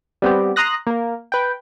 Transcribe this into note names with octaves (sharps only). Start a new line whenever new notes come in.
G3 B3 C4 G4
A#5 C6 D#6 F#6 A#6
A#3 A#4
B4 G5